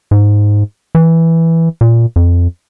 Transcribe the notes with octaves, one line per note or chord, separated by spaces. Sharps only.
G#2
E3
A#2
F2